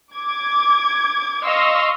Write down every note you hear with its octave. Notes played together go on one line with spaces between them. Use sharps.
D6 G#6
D#5 F5 C6 C#6 E6